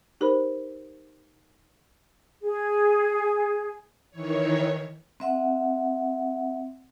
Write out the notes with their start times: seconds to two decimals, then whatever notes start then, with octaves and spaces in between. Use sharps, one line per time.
0.21 D#4 G4 A#4 C5 B5
2.43 G#4
4.11 D#3 E3 C#5
5.20 C4 E5 F#5